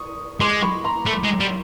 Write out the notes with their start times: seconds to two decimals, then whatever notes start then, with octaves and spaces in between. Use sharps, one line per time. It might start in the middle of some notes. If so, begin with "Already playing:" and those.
Already playing: C#6 D#6
0.40 G#3 C6 D6
0.62 B5 C#6
0.84 A#5 C6
1.06 A3
1.24 G#3
1.40 G3